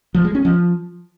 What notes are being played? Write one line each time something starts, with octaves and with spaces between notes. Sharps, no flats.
F3
G#3
C#4
F3